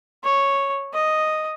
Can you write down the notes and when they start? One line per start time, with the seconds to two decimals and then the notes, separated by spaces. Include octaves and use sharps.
0.24 C#5
0.94 D#5